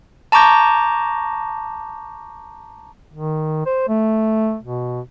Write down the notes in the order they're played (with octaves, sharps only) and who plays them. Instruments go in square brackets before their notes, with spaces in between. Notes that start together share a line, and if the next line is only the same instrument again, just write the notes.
[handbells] A5 A#5 C#6 D6 G6 A#6
[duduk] D#3
C5
A3
B2